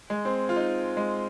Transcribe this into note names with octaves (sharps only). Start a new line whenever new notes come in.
G#3
C4
F4
D#4
G#3